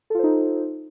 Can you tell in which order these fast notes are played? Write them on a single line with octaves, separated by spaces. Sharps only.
A4 F4 C5 D#4